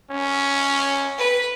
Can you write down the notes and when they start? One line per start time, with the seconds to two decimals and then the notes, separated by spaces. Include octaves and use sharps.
0.11 C#4
1.18 B4